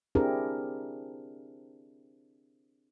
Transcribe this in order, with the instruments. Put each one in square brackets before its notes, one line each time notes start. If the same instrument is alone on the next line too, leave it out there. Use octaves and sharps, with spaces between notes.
[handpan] C4 D4 E4 G4 G#4 A#4